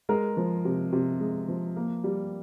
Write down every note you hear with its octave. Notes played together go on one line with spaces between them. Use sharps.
G#3 A#4
F3
C3
C3
G#3
F3
A#3
G3